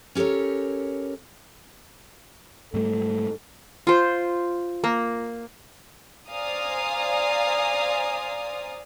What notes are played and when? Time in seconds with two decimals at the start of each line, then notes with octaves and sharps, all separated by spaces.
0.15 C#4 G4 A4 A#4 C#5
2.74 G#2 G3 A3 A4
3.87 F4 C5
4.84 A#3
6.30 C5 D5 F5 G#5 A#5 D#6